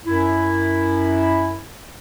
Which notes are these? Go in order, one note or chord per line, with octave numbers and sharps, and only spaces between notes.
F#2 E4